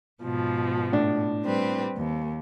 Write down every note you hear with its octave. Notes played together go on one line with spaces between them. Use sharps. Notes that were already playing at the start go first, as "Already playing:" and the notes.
G#2 B2 F3
A2 D4
G3 C4 B4
D#2